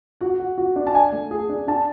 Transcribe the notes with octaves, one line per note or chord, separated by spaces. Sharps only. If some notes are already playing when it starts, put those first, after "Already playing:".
F#4 F#5
F#4
F#4
D4
A5
D5 G#5
A3
G#4
D4
D4 A5